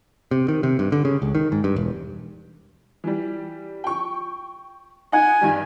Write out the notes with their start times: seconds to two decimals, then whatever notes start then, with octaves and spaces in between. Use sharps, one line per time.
0.31 C3
0.48 D#3
0.63 C3
0.79 G2
0.92 D3
1.05 C#3
1.22 C#2
1.35 D#3
1.52 G#2
1.64 G2
1.76 E1
3.04 E3 G3
3.84 G5 C#6
5.12 D#4 F#5 G#5
5.41 G2 D#3 G3